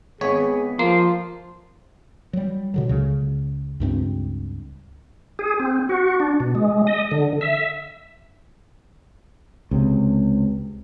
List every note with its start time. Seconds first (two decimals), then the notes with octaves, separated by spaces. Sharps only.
0.21 G#1 B3 G#4 C#5
0.79 F3 A#3 F4 C6
2.33 F#3 G3
2.74 B2 D3 F#3
2.89 C#2 C#3
3.80 C#2 G2 A3 C4
5.39 G#4
5.60 C4
5.89 F#4
6.20 D4
6.40 B2
6.55 G#3
6.87 D#5
7.11 D3
7.41 E5
9.71 C#2 C3